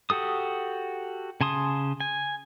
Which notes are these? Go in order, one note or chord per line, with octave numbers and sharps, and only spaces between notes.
F#4 G4 A4 D#6
C#3 G#5 A5 C6 D#6
G#5